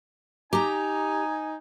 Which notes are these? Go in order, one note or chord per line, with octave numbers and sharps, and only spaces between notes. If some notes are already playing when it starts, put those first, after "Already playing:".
D#4 G4 G#5 A#5